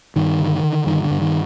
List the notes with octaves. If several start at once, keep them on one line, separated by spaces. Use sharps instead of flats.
G2 D#3
D3
D3
G2 D#3
D3
G2
D#3